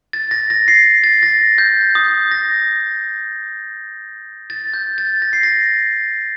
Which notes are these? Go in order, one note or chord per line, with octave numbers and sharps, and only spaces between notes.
A6
A#6
A#6
C7
A6
A#6
G6
D#6
A#6
A6
G6
A6
A#6
C7
A#6